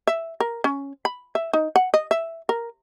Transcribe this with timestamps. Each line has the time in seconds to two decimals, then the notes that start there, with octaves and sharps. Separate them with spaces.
0.07 E5
0.40 A#4
0.64 C#4
1.05 B5
1.35 E5
1.53 D#4
1.76 F#5
1.94 D#5
2.11 E5
2.49 A#4